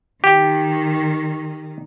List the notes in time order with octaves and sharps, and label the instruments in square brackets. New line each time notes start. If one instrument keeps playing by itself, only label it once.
[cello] D#3 [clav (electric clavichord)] G4